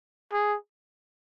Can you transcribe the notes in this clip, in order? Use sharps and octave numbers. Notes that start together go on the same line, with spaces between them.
G#4